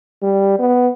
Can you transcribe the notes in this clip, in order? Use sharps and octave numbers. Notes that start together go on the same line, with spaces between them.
G3
B3